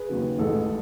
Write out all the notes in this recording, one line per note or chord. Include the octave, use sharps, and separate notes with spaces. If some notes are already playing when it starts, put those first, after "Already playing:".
Already playing: G#4 B4
D#2 C#3 F#3
A1 A2 E3 G#3 A4